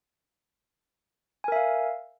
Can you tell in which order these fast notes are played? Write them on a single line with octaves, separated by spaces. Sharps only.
G#5 A#4 E5 F5